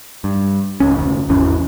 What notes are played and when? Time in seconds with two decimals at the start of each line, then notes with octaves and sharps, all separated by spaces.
0.24 G2
0.80 D1 C#2 C#4
0.98 F1 D2
1.29 G#1 E2 E3 C#4